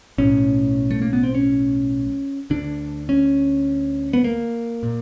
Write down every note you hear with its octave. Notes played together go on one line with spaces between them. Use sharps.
B1 A2 C#4
A3
A#3
B3
C4
C#4
D2 D3 D4
C#4
B3
A#3
A#2